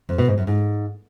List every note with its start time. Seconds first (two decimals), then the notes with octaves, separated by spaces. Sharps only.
0.09 F2
0.18 B2
0.28 G#2
0.38 F#2
0.47 G#2